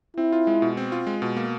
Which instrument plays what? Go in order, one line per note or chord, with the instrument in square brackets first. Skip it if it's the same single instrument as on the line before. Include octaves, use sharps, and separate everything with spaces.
[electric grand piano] C4 [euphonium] E4
[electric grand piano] F4
G#3
B2
C4
F4
G#3
B2
A#3